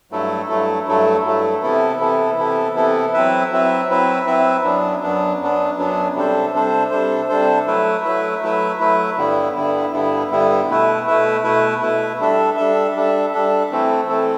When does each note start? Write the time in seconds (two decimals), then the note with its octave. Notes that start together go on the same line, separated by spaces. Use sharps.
0.11 G2 F#3 A3 E4 A4
0.49 G2 F#3 A3 E4 A4
0.86 G2 F#3 A3 E4 A4
1.24 G2 F#3 A3 E4 A4
1.63 C3 E3 B3 E4 A4
2.00 C3 E3 B3 E4 A4
2.37 C3 E3 B3 E4 A4
2.75 C3 E3 B3 E4 A4
3.13 F#3 C4 E4 B4 E5
3.51 F#3 C4 E4 B4 E5
3.89 F#3 C4 E4 B4 E5
4.27 F#3 C4 E4 B4 E5
4.64 F#2 F#3 B3 D4
5.02 F#2 F#3 B3 D4
5.40 F#2 F#3 B3 D4
5.78 F#2 F#3 B3 D4
6.15 C3 G3 D4 A4 C5
6.53 C3 G3 D4 A4 C5
6.91 C3 G3 D4 A4 C5
7.29 C3 G3 D4 A4 C5
7.67 F#3 A3 E4 B4 E5
8.04 F#3 A3 E4 B4 E5
8.42 F#3 A3 E4 B4 E5
8.80 F#3 A3 E4 B4 E5
9.17 G2 D3 G3 B3 E4
9.56 G2 D3 G3 B3 E4
9.93 G2 D3 G3 B3 E4
10.31 G2 D3 G3 B3 E4
10.69 B2 A3 E4 B4 E5
11.07 B2 A3 E4 B4 E5
11.44 B2 A3 E4 B4 E5
11.82 B2 A3 E4 B4 E5
12.20 G3 D4 A4 E5
12.57 G3 D4 A4 E5
12.95 G3 D4 A4 E5
13.33 G3 D4 A4 E5
13.71 E3 A3 C4 E4 A4
14.09 E3 A3 C4 E4 A4